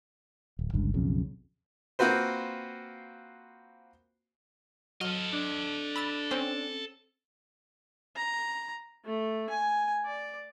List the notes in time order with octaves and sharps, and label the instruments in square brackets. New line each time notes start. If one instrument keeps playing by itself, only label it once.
[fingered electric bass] D1
G1 C#2 G2
B1 F2 C#3
[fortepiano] A#3 C4 F4 F#4 B4 C5
[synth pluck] F#3 F6 [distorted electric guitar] A4 D#5
[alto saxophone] D4
[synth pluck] B5 E6 A6
C4 C#4 C5
[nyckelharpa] A#5
A3
G#5
D5